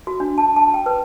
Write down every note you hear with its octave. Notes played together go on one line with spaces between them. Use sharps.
F#4
D4
A5
A5
G5
B4